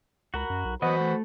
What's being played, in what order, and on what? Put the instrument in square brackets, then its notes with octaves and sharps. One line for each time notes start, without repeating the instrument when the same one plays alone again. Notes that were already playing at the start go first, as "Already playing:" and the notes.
[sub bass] C#2 [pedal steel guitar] F#4 A#4 B5
[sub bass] F#2
B1
[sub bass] E3 [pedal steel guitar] F#3 B3 D#5 [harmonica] F#4 C5 B5
[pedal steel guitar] A3